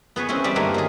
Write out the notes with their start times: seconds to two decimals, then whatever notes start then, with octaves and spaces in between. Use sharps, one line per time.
0.16 B3 G#4 B4 C#5
0.29 C4 C#4 E4 G#4
0.44 E2 G3 D5 E5
0.56 G2 D#3 E3 A3 A#3 G#5
0.74 F#3 F4 G#4